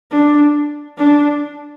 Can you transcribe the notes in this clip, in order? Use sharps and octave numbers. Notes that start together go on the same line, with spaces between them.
D4
D4